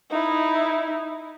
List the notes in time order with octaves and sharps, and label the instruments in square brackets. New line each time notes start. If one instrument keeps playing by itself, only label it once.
[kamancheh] D#4 E4